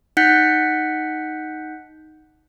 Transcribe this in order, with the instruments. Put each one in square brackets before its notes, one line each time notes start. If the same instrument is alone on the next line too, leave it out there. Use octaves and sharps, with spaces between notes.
[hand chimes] D#4 F#5 F#6 G6 B6 C#7